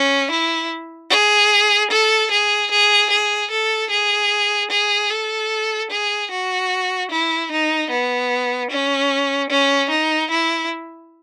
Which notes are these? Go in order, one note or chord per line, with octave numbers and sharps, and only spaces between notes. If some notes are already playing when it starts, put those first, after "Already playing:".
Already playing: C#4
E4
G#4
A4
G#4
G#4
G#4
A4
G#4
G#4
A4
G#4
F#4
E4
D#4
B3
C#4
C#4
D#4
E4